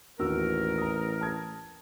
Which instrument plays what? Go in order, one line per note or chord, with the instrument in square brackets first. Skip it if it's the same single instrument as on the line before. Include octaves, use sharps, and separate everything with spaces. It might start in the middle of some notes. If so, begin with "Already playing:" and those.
[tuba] A1 [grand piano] D#2 F#4 E6 [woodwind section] A#4
[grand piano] A#5 D#6
A5 D#6 G#6